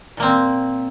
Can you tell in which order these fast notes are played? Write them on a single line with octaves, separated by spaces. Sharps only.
A#2 A#3 C4